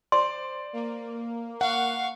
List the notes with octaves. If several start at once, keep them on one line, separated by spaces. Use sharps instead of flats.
C5 D5 C6
A#3
F5 F#5 C#6